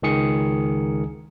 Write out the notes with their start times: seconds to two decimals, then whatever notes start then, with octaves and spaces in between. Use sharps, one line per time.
0.02 C#2 D#3 G#4 C#7